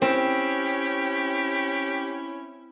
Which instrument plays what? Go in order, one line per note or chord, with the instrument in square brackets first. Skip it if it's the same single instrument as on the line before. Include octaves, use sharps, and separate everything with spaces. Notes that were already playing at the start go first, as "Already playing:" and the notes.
[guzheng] C4 [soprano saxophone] C#4 [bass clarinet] E4 [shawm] G4